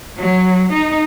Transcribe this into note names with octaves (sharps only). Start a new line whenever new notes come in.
F#3
D#4